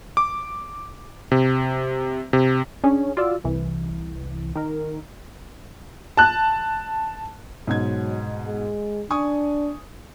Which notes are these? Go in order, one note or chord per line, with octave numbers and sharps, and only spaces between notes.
D6
C3
C3
C#4 D4 G#4
F4 F#4 D5 E6
C2 E3
D#3 A#4
A5 F#6
G#2 B2 F#3 G#6
G#3
D4 G#5 C#6 D#6